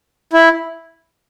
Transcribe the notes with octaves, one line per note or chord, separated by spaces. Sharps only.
E4